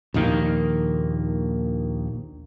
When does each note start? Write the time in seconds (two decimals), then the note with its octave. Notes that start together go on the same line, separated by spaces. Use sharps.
0.14 A#1 D#2 D#3 A#3